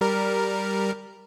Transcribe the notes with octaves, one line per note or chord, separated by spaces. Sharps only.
G3 A#4